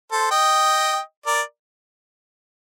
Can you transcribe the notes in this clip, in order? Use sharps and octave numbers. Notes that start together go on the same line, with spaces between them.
A4 C5
D#5 G5
A#4 D5